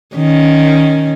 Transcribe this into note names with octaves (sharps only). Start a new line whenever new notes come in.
D#3 C#4